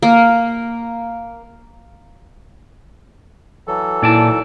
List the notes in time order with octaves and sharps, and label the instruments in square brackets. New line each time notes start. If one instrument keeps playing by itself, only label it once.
[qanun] A#3
[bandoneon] E3 F#3 A4
[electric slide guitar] A#2 D5 A5 [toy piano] D#4 E4